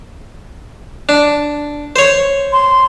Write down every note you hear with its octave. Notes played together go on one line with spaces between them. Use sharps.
D4
C5 C#5
C6